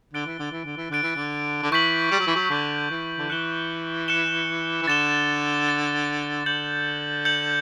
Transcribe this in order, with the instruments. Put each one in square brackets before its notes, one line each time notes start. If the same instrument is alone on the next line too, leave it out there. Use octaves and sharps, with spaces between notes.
[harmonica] D3 [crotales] F#6 A6 D7 G7
[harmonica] E3
D3
E3
D3
E3
[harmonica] D3 [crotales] F#6 A6 D7 G7
[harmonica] E3
D3
D3
[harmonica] E3 [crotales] C#6 G6 B6 F#7
[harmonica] G3
F#3
E3
F#3
[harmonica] D3 [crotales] C#6 G6 B6 F#7
[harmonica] E3
D3
[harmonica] E3 [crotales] F#6 C#7 E7 G7
[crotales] F#6 C#7 E7 G7
[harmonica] E3
[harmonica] D3 [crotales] A6 E7 G7
[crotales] A6 E7 G7
[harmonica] D3 [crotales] G6 C#7 F#7
[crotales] G6 C#7 F#7